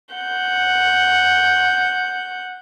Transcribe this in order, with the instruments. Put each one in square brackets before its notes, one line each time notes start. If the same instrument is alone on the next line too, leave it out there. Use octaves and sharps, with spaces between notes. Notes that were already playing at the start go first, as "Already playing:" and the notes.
[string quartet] F#5 G6